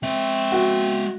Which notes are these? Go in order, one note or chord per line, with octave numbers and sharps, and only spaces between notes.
G#3 C4 E5
F#4